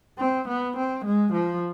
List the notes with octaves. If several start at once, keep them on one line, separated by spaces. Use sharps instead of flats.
C4
B3
C4
G#3
F3